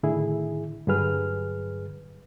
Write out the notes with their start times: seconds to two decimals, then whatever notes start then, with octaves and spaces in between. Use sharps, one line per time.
0.03 A2 D3 D#3 E4 G#4
0.87 G2 D3 F#3 G#4 B4 F6